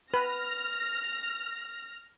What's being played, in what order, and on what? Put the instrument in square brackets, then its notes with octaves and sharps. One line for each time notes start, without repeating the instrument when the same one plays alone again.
[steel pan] B4 [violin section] F6 A#6